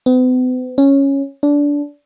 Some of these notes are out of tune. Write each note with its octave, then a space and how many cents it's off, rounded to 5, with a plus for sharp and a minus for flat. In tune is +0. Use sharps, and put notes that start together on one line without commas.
B3 +45
C#4 -5
D4 -20